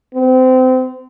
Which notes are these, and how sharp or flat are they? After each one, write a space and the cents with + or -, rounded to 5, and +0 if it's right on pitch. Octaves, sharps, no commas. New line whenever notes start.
C4 -30